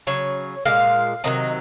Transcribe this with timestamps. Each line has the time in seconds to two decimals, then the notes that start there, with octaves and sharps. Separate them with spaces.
0.07 C#3 F#3 C#5
0.65 A#2 G#3 F5
1.24 C3 D#3 F#3 D#5